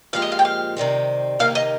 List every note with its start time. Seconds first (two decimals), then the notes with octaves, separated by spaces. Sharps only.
0.13 A#2 F3 G#3 C4 G4 F5
0.22 D#5
0.32 F5
0.39 G5
0.45 F5
0.77 C3 D#3 G3 C4
1.39 C3 D#3 A#3 D#4 F5
1.55 D#5